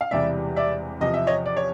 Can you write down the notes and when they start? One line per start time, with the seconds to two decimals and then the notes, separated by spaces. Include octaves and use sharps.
0.01 F5
0.11 E1 E2 C3 E3 G3 D5 E5
0.56 D5 E5
1.01 E2 C3 F3 D#5
1.14 E5
1.27 C#5 D#5
1.46 D5
1.57 C#5